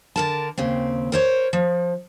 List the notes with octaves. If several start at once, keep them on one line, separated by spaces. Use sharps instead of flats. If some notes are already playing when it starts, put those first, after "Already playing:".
D3 A#4 A5
D#2 C#3 C4
A#4 C5 C#5
F3